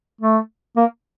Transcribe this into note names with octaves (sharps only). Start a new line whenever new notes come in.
A3
A#3